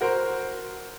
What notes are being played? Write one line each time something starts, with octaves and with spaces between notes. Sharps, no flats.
F#4 A#4 C5